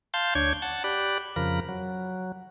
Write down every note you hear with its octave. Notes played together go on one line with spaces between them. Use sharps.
F5 A5 C6 G6
D2 D4 C#5 G6 G#6
F#5 A5
G4 D5 B5 F#6
F2 C#3 F3 A#4 B5
F#3